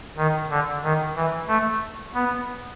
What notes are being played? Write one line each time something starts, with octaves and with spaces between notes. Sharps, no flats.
D#3
D3
D#3
E3
A3
B3